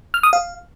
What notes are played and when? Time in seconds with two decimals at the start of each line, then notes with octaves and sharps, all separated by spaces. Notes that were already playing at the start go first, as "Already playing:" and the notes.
0.14 F6
0.23 D#6
0.33 F5